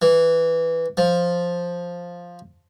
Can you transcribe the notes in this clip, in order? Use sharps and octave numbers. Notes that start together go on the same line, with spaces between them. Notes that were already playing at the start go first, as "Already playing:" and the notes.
E3
F3